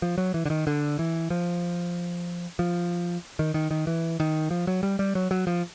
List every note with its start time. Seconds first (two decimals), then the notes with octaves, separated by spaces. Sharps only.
0.02 F3
0.18 F#3
0.34 E3
0.45 D3
0.50 D#3
0.67 D3
0.99 E3
1.30 F3
2.59 F3
3.39 D#3
3.54 D#3
3.71 D#3
3.87 E3
4.20 D#3
4.51 F3
4.67 F#3
4.83 G3
4.99 G3
5.15 F#3
5.31 F#3
5.47 F3